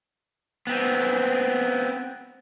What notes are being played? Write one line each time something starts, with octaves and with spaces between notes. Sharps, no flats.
B3 C4